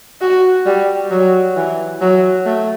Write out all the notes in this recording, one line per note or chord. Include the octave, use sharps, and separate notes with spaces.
F#4
G3
F#3
E3
F#3
A3